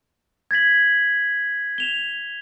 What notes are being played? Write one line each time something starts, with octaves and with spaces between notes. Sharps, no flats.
G#6 A6 B6 F#7
E7 F7 G7